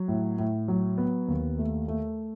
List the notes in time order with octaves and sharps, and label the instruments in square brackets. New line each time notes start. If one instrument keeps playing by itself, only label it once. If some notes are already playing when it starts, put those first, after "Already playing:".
Already playing: [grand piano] F#3
A2
A2
F#3
B3
D#2
A3
A3